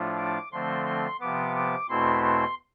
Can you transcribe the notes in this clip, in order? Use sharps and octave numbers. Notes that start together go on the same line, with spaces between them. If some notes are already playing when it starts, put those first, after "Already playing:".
Already playing: A2 F3 A3 D4 F4
D6
D3 F3 A3 C4 C6
C6
C3 F3 B3 D6
D6
E2 B2 A3 C4 E4 C6
C6